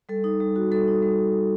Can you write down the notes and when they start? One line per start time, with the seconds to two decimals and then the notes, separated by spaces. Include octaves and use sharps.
0.09 G3 A4
0.24 D#4
0.40 G3
0.56 F#4
0.72 G3 A4
0.88 D#4
1.03 G3